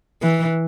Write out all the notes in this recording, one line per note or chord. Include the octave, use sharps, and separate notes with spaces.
E3